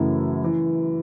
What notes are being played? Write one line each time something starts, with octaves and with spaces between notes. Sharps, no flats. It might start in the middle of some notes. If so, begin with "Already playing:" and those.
Already playing: F#2 C#3 E3 A3 E4
E3